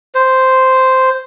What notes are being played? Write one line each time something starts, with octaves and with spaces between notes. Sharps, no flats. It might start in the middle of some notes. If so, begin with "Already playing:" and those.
C5